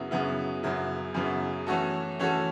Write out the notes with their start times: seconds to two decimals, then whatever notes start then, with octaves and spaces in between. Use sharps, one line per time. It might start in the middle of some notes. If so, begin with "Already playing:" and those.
Already playing: F#2 C#3 F#3 B3 E4
0.11 F#2 C#3 F#3 B3 E4
0.63 F#2 C#3 F#3 B3 E4
1.14 F#2 C#3 F#3 B3 E4
1.67 E3 A3 C#4 F#4 A4
2.19 E3 A3 C#4 F#4 A4